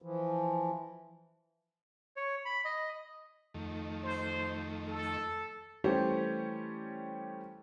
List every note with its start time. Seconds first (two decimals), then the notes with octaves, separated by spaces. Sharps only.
0.02 E3 F3
2.16 C#5
2.45 B5
2.65 D#5
3.54 F2 D#3 A3
4.03 C5
4.88 A4
5.84 E3 G3 A3 C#4 G4 C5